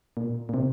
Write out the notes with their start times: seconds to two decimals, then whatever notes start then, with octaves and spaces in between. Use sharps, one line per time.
0.17 A#2
0.49 A#2
0.54 C3